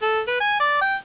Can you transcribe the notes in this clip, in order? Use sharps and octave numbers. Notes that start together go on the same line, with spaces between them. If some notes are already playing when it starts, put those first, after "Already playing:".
A4
B4
G#5
D5
G5